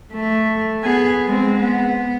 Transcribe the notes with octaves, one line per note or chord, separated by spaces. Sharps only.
A3
B3 G#4
G#3 C4
B3